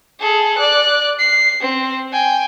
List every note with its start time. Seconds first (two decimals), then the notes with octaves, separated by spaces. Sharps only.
0.19 G#4 A4
0.58 D5 F#6
1.19 C7
1.60 C4
2.12 G5 G#5